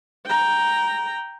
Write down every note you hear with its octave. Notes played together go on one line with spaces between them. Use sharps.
G5 A#5